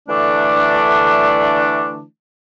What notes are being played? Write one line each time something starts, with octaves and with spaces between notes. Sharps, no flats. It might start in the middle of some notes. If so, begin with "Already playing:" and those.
D3 E3 A3 D4